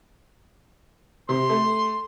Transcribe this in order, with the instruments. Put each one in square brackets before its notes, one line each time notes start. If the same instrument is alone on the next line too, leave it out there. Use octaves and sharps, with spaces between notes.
[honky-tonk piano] C3 [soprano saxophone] C6
[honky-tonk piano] A3